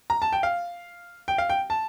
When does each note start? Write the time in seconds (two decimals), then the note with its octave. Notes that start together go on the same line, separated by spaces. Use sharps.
0.10 A#5
0.22 A5
0.33 G5
0.43 F5
1.28 G5
1.38 F5
1.50 G5
1.70 A5